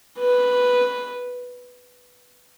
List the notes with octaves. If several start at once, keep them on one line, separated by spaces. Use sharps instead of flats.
B4